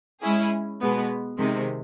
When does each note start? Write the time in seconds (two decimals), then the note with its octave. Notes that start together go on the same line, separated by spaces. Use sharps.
0.22 G#3 C#4 E4 G#4
0.81 B2 G#3 B3
1.38 C3 D#3 G#3 C4